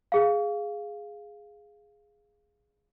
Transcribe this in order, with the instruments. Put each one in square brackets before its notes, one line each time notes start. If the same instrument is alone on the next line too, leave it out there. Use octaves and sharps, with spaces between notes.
[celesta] G#4 F5